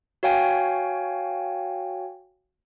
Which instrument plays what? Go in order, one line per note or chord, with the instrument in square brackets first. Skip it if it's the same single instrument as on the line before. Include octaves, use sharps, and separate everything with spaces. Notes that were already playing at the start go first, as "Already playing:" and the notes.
[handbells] F#4 C#5 F5 G5 G#5